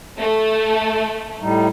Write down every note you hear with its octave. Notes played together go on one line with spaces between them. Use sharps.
A3
A2 G3 D#4